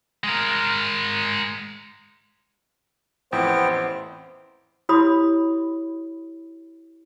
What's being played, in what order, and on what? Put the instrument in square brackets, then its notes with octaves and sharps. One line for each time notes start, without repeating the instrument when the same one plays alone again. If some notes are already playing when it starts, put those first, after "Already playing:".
[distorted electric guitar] G#3 A#4
[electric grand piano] A1 F2 E4 [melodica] B3 G5 [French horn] C5
[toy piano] E4 F#4 G4 C#5 B5 D#6